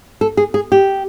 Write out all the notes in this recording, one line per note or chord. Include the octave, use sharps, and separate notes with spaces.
A4
G#4
G#4
G4